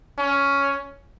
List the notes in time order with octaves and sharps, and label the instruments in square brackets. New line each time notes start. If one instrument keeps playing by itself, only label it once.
[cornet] C#4